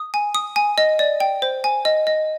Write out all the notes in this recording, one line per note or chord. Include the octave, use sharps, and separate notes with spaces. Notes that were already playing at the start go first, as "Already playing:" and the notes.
Already playing: D#6
G#5
D#6
G#5
D#5
D5
G5
C5
G#5
D#5
D#5